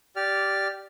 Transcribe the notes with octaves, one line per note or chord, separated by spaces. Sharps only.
G4 D5 F6